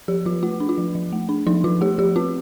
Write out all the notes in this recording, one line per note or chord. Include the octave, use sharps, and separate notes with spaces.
F3 G4
F3 F4
A3 F4
D4
F4
F3
F3
A3
D4
F3 D#4
F3 F4
A3 G4
F3 G4
C4 F4